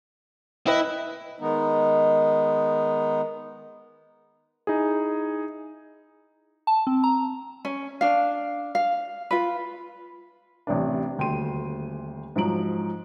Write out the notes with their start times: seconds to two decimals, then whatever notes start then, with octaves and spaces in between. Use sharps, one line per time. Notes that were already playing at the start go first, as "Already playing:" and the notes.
0.67 E4 B4 D#5 G5
1.40 D#3 G#3 B3 D#4
4.67 D#4 E4 G#4
6.67 A5
6.87 C4
7.04 A#5
7.65 C#4
8.01 D4 F5
8.75 F5
9.31 F4 B4
10.67 A1 C3 D4
11.17 D#1 D2 G5 C6 D#7
12.36 G#2 F3 F#3 D7 F#7